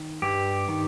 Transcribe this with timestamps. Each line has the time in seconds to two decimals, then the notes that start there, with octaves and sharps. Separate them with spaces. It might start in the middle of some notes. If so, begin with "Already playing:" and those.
Already playing: D#3
0.22 G2 G4
0.68 D#3